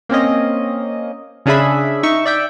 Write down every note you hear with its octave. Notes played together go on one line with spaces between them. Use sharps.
A#3 C4 C#4 D#5
C#3 C#4 D4 G#4 E5 B5
D#4 E5 C#6
D5 E5 G5